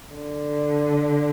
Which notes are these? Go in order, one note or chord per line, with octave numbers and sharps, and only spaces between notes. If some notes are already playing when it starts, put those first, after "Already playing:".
D3